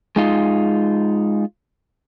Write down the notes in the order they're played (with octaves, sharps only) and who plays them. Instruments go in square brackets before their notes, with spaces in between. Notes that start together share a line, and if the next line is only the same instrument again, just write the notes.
[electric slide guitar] G#3 D#4 F4